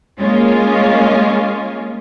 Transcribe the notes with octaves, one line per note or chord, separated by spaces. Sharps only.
G#3 A#3 C#4 F4